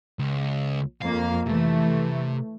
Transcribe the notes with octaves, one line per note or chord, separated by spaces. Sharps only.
C#2
F2 A#3 F5
C3 E3 A3